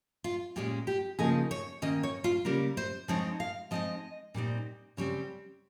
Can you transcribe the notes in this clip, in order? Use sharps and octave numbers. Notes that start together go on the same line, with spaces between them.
F4
A#2 G#3 C#4 G4
G4
C#3 F3 A#3 D#4 G#4
C#5
D#3 A#3 C#4 D#5
C#5
F4
C#3 G3 A#3 A#4
C5
F3 G#3 C4 D#4 C#5
F5
F3 G#3 C4 D#4 D#5
A#2 G3 C4 D#4
C#3 G3 C4 C#5